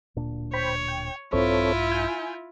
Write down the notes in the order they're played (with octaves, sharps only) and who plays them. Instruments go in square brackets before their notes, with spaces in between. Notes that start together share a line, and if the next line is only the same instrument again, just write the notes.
[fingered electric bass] D1 A#2 D4
[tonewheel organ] C5 G5 B5 [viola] C#5
[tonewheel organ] G5
[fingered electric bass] A#1 G2 [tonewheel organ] C4 A4 C#5 [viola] E4 F4
[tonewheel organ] G#5 G6